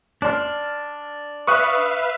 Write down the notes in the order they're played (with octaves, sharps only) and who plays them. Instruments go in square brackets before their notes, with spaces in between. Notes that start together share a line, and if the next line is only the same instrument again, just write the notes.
[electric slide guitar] D4 [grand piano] D5 C6 F6
[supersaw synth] B4 E5 F5 [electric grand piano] C#6 D#6 F#6